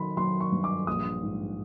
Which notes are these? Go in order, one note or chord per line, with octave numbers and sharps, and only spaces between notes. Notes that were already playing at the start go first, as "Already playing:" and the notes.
Already playing: D#3 F#3 B5 C6
F#3 C6
C#6
G2
D6
A#1 D#6
G#2